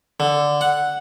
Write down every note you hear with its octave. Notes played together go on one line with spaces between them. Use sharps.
D3
F#5